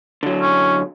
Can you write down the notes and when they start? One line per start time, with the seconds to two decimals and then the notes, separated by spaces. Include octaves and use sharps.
0.23 D3 F#3
0.42 C#4